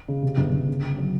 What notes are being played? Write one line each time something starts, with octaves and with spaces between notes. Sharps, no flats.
C#3
C3
G1
G1
C#3
C#3
F#3